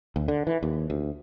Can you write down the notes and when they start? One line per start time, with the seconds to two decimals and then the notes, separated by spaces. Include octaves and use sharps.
0.16 D2
0.28 D3
0.47 E3
0.63 D#2
0.90 D2